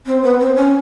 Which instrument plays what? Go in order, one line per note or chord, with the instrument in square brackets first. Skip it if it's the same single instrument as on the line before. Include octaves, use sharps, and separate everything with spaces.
[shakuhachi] C4
B3
C4
C#4